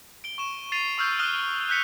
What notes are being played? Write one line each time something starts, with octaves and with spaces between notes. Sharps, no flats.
D7 G7
C#6 E7
A6 C7 D#7 F7
C#6 E6 F6 G6
D#6 F6 F#6 A6 E7 G7
F#6 G6 B6 C#7 F7